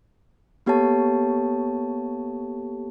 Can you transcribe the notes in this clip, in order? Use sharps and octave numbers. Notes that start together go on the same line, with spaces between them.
A#3 B3 G4 A4 C#5 A5